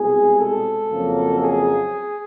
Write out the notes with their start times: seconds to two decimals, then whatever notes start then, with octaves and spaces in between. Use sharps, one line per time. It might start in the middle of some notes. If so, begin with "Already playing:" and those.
Already playing: C2 B2 G#3 G#4
0.38 A4
0.90 F2 C#3 F#3 A#3
1.39 G#4